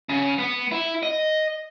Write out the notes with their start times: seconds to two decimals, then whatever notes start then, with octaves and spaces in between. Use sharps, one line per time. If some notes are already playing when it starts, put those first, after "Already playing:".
0.09 C#3
0.38 B3
0.72 E4
1.03 D#5